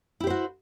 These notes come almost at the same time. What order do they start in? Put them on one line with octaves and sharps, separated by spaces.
E4 G4 C5 F#4